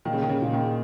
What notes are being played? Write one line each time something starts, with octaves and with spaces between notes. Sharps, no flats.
A#2 D#3
C#3
D#3
C#3
A#2
D#3